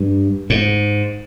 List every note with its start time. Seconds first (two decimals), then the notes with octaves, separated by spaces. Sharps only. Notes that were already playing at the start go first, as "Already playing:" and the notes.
Already playing: G2
0.50 G#2